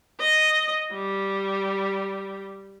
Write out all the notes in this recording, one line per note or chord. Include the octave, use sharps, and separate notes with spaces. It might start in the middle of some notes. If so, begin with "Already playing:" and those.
D#5
G3